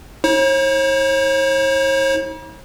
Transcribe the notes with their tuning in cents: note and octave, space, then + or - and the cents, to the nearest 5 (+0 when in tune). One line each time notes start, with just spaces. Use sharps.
D#4 +45 C#5 -45